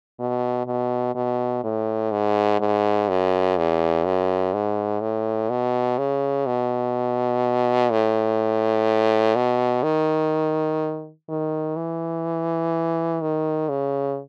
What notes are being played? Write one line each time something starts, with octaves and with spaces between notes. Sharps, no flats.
B2
B2
B2
A2
G#2
G#2
F#2
E2
F#2
G#2
A2
B2
C#3
B2
A2
B2
D#3
D#3
E3
D#3
C#3